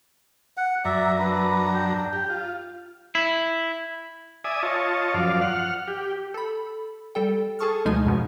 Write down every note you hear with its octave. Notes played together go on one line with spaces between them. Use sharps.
F#5
F#2 D5 E5 A#5
D4 B4
G5
G4
F4
E4
D5 E5 G#5 D#6
F4 C#5 D#5 A5
F#2 F3 D5 F5
F#5 F6
G4
A4 B5
G3 A4 G5
G#4 A4 A5 C#6 D#6 F6
D2 B2 F3 G#3 D#4 G#5
F#2 B2 F3